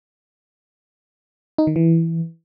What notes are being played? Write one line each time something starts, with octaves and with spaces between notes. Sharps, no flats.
D#4
D#3
E3